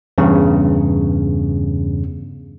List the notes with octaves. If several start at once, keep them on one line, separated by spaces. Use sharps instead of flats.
E2 G2 C#3